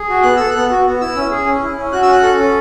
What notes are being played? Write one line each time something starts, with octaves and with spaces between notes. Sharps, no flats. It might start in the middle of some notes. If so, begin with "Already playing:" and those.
Already playing: G#4
F#4
B3 F#6
A4 E6
F#6
B3
F#4
B3
E4 E6
C#4
G#4
C#4
E4
C#4
F#4 F#6
E6
C#4 F#6
A4
C#4